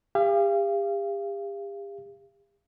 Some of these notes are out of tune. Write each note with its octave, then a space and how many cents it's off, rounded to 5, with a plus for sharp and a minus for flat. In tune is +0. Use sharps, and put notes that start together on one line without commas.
G4 +40 F5 -30